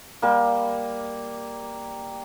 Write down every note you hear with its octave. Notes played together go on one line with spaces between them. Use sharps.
G3 A#3